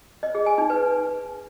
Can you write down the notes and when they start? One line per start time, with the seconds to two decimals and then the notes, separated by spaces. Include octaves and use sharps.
0.23 D#5
0.35 G#4
0.46 G#5
0.58 D#4
0.70 B4